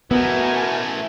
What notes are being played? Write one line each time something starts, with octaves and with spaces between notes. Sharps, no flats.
B2 E3 A3 B3 A#4 G#5